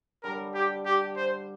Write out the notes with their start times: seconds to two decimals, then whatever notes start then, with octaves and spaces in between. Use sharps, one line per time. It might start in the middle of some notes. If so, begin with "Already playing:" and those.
0.23 D3 G3 A#4
0.54 G4
0.85 G4
1.16 C5